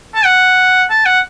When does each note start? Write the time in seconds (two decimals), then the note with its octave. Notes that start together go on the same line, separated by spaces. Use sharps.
0.15 A5
0.24 F#5
0.90 A5
1.05 F#5